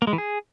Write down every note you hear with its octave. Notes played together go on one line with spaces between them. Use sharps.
A#3
G#3
E3
G#4